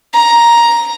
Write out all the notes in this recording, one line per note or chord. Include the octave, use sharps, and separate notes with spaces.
A#5